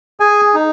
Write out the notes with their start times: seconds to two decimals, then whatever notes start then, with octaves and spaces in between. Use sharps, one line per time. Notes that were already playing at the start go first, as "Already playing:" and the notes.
0.20 G#4 G#5
0.54 D#4